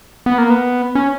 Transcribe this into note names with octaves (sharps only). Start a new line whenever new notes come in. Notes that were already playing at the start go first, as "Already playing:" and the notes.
B3
A#3
B3
C#4